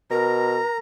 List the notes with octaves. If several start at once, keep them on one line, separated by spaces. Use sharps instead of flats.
B2 A#4 A#5